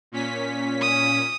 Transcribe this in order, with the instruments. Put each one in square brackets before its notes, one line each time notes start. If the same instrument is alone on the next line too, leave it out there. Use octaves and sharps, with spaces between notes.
[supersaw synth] A#2 C#4 B6
[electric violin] D#6